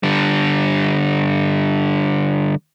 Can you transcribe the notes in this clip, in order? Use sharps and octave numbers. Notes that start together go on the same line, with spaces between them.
D3 G3